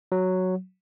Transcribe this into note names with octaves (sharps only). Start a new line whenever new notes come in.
F#3